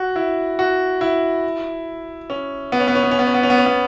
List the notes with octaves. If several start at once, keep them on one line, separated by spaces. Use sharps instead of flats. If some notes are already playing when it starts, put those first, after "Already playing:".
Already playing: F#4
E4
F#4
E4
C#4
B3
C#4
B3
C#4
B3
C#4
B3
C#4
B3
C#4
B3
C#4
B3